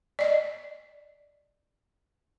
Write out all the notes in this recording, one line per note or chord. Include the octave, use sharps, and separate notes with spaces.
D5 D#5